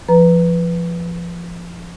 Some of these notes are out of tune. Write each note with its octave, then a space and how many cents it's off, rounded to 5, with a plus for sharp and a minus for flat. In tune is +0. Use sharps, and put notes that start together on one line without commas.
F3 -20 B4 +0 A#5 +0